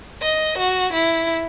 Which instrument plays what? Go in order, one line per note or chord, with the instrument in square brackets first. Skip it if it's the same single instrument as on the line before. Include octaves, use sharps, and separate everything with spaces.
[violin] D#5
F#4
E4